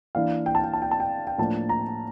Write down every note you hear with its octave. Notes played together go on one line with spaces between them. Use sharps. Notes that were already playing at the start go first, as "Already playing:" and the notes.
E3 A#3 D4 F5
G5
A5
G5
A5
G5
A5
G5
G5
A2 F3 A#3 D4 A5
A#5